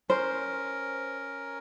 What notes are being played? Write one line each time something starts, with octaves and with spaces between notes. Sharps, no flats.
C#4 A#4 C5